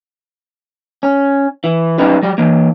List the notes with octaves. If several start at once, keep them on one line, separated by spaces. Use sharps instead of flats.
C#4
E3
F#3 G3 C#4 D#4 B4
F#3 G3
E3 A#3